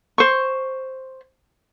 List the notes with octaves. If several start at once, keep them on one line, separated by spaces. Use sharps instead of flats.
C5 C#6